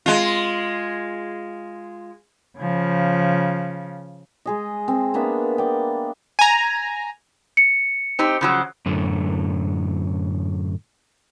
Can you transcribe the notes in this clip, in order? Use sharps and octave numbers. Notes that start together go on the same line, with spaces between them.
G#3 F4
C#3 F3
G#3 G#4 D#5
C4
A#3 B3 D4 E5
D5 G5
G#5 A#5
C#7
C4 D#4 G4
C#3 F3 F#3
F#2 A2 D3